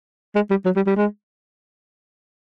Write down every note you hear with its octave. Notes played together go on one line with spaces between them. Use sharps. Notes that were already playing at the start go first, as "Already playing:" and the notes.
G#3
G3
F#3
G3
G3
G#3